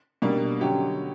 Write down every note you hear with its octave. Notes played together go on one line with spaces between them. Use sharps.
B2 G3 A#3 D4
D3 F#3 C#4 G4